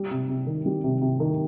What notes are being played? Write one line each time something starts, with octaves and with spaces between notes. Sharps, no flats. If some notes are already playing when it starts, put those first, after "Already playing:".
Already playing: G3
C3
C3
D#3
G3
C3
C3
D#3